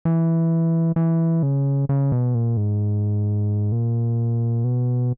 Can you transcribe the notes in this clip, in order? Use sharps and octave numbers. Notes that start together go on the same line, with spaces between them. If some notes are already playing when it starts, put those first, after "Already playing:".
E3
E3
C#3
C#3
B2
A#2
G#2
A#2
B2